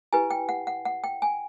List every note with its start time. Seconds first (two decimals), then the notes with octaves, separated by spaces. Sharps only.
0.13 E4 G4 B4 G#5
0.31 G5
0.49 F#5
0.67 F#5
0.85 F#5
1.04 G5
1.22 G#5